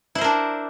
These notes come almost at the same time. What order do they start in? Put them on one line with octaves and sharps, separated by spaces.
E4 C5 A#4 D4